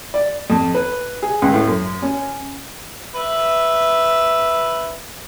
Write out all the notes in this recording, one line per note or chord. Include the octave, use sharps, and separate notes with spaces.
D5
F2
B4
G#4
C#2
A2
F#2
C#4
B4 E5